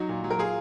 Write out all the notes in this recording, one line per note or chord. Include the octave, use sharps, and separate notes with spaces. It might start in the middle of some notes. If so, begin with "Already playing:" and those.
Already playing: F#3 D#4 F#4
A#2
F#3
A#4
F4 G#4